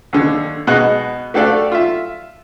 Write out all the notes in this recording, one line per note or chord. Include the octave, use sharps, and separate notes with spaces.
D#2 D3
B2 G#3 D#5 F#5 F#6
A3 F#4 G4 A4 D5 F5
F4 E5